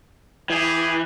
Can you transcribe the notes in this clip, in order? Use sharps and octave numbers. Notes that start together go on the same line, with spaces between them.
E3 G4 G#4